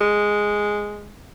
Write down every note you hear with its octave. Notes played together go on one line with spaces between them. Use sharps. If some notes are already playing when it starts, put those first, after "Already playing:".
G#3